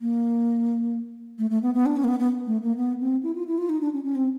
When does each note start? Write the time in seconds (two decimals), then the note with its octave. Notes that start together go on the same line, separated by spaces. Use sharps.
0.01 A#3
1.39 A3
1.50 A3
1.62 B3
1.74 B3
1.86 D4
1.97 C#4
2.04 A#3
2.08 B3
2.19 B3
2.47 A3
2.62 A#3
2.77 B3
3.00 C4
3.23 E4
3.36 F4
3.47 E4
3.58 F4
3.69 D#4
3.81 D4
3.93 C#4
4.04 C#4
4.15 C4